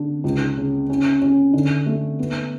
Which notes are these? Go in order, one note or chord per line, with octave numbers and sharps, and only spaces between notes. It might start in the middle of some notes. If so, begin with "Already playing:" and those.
Already playing: D3 D4
C#2
C#3
C#4
C#4
D3
A3
B3